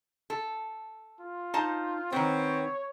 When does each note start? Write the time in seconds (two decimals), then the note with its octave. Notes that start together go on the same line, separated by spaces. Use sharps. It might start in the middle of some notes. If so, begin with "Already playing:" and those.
0.30 A4
1.20 F4
1.54 D#4 C5 A5
2.12 D#3 B3 C4 C#5